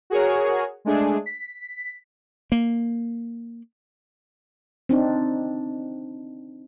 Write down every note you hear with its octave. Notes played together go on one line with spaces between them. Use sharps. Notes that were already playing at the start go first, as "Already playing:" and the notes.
F#4 G#4 A#4 C#5
G#3 A3 D4 G#4
B6
A#3
C4 D4 D#4